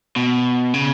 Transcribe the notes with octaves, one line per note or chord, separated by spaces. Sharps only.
B2
C#3